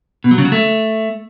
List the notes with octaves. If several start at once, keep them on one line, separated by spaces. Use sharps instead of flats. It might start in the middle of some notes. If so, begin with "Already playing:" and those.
B2
F#3
C#3
F#3
A3